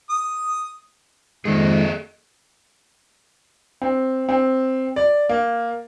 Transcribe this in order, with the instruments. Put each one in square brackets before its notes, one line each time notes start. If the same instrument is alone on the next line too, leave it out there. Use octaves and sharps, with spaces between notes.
[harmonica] D#6
[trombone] F2 [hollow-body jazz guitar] G#2 D#3 [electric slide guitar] G#4 A4 D#5
[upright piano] C4
C4
D5
A#3